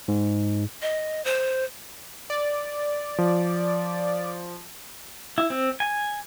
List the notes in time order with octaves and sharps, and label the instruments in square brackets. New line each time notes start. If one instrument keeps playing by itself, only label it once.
[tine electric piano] G#2
[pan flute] D#5
C5
[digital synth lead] D5
[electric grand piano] F3
[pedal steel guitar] E4
C4
G#5